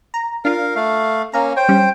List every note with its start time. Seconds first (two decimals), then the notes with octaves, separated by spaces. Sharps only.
0.14 A#5
0.45 D4 F4 A#4 F5
0.75 A3 F5
1.33 A#3 C#4 F5 A#5
1.57 C5 C#5 G5
1.69 G3 C#4